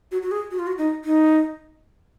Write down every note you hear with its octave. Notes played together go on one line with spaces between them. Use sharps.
F#4
F#4
G#4
F#4
F4
F#4
D#4
D#4